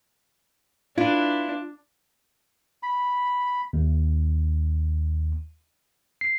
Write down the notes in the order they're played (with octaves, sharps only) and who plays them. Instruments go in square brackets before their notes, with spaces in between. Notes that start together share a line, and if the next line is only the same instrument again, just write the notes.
[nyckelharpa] D4 [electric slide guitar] E4 B4 [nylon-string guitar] F4
[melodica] B5
[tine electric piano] D#2
C7